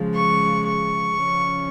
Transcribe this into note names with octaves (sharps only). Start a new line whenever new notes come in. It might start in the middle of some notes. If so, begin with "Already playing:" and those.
Already playing: C#3 F3 G#3
C#6
C#6
C#3 F3 C#4